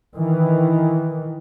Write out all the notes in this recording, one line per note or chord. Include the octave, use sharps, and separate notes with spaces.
D#3 E3